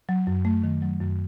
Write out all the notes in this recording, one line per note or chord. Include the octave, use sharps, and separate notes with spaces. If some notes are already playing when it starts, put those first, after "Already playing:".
F#3
F#2
A3
D#3
F#3
F#2